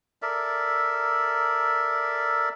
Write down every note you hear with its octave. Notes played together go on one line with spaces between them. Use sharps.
A4 A#4 D5 E5